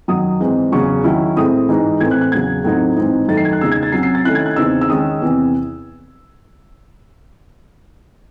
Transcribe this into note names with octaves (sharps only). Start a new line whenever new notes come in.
F#2 D#3 F#3 D#6
G#2 E3 G#3 C4
E2 C#3 F#3 C#6
D#3 F#3 C#4 E4
A2 G#3 C4 E4 D#6
G#2 E3 G#3 D#4
A2 E3 C4 G#6
F#6
F#6
E2 C#3 F#3 G#6
A2 F#3 C4 D#4
G#2 E3 C4 D#4
F#2 D#3 A3 D#4 A6
C7
G#6
F#6
E2 C#3 G#3 D#4 E6
G#6
A6
C3 F#3 C#4 C7
C7
A6
D#3 A3 C#4 E4 F#6
G#6
F#6
E2 C#3 E3 C4 D#4 E6
E6
D#3 G#3 C#4 D#6
E2 C3 E3